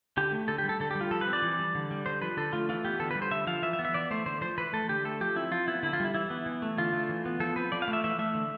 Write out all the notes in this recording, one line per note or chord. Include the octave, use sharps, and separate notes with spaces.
D3 G4
A3
D3 A4
G4
G3
A4
D3 A4
G4
G3
F4
F3 A4
B4
C4
D5
E3
G3
D3
G3
D3 C5
F3 B4
D3 A4
A3 F4
E3 F4
B3 G4
D3 A4
B4
G3
C5
D3 E5
F3 F5
E3 E5
E5
B3
E5
E3 D5
A3 C5
D3 C5
F3 C5
E3 B4
A3 A4
D3 G4
A3 A4
F3 G4
C4 E4
F3 F4
B3 E4
D3 E4
F4
G3 E4
E3 E4
B3
E3
A3
D3 F4
A3
E3
B3
F3 A4
C4 B4
F3 D5
F5
A3
E5
E3 E5
A3 E5
D3